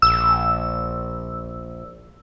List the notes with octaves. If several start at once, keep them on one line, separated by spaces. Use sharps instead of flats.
A#1 E6